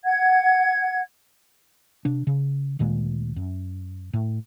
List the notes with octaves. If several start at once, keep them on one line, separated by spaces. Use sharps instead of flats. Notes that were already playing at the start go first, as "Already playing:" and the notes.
F#5 G#6
C3 D4
C#3
D2 A#2 D#3 G#3
F#2
A2